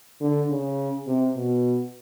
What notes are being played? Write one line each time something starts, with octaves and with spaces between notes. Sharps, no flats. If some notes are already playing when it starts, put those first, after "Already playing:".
D3
C#3
C3
B2